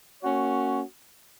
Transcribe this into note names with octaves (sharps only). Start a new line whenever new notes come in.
A#3 C#4 F#4 C#5